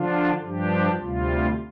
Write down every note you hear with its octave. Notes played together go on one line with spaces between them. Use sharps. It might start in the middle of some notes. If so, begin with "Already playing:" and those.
Already playing: D3 F3 D4 F4
G2 F3 D4 G4
D2 C3 G3 F4